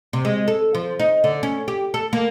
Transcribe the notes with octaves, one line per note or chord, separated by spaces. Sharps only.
C3
G#3
A4
F3
D#4
D3
C#4
G4
A4
A#3